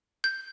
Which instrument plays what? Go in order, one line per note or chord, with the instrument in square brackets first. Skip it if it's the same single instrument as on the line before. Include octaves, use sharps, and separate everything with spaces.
[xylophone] G6